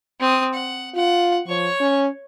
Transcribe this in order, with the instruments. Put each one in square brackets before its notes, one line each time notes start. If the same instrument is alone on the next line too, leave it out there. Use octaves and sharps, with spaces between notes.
[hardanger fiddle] C4 D#6
F#5
[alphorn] F4 [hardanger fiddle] F#5
[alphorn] F3 [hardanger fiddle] C#5 C#6
[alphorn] C#4